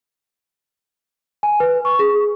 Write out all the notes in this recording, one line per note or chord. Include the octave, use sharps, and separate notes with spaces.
G#5
B4
C#6
G#4